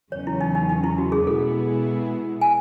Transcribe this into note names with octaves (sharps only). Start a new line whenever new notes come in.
E2 C#3 F#3 C#4 C#5
E4
D#4
D#4
D#4
E4
F#4
G#4
B2 G#3 B3 E4 G#4 A4
G#5